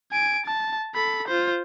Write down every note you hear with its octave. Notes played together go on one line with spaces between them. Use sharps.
G#5 D7
A5
A4 B5
F4 C5